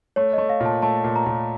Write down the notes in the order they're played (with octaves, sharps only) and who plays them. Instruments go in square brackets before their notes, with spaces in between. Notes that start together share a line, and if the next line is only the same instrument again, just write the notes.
[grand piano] A3 [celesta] C#5
[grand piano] A3 [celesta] D#5
[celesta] F5
[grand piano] A#2 [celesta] A5
[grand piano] A3 [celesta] A5
[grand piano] A#2
[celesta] A#5
[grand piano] A#2